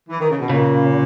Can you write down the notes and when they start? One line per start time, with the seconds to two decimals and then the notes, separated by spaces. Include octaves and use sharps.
0.09 E3
0.19 D#3
0.29 C#3
0.40 B2
0.50 A#2 C#3